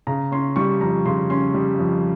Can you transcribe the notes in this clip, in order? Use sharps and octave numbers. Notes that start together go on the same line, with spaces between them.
C#3 A#5
C#4 C6
G3 C#6
F2 A#5
C#3 C6
C#4 C6
G3
F2